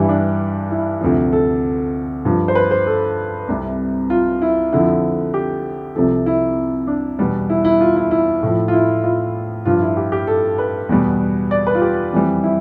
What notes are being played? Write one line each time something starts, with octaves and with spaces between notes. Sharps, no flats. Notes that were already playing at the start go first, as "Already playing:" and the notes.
Already playing: G2 E3 G3 E4 G4
D4
E4
D2 C3 F3
A4
G2 F3
C5
B4
C5
A4
C2 C3 G3
F4
E4
F2 D3 F3 E4
G4
C2 C3 F3 A4
E4
D4
E2 B2 G3
E4
E4
F4
E4
E4
A2 F3
F4
E4
F4
G2 F3 F4
E4
G4
G4
A4
B4
E2 B2 G3
D5
B4
F4
G4
F2 E3 G3
E4